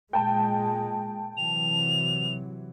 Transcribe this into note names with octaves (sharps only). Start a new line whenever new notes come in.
A#2 G#3 G5 A5
C3 E3 F#3 F7